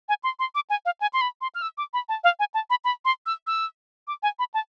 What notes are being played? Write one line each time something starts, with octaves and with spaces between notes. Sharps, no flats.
G#5
C6
C6
D6
G#5
F5
G#5
C6
B5
C6
F6
E6
D6
B5
A5
F5
G#5
A5
B5
B5
C6
E6
E6
D6
G#5
B5
A5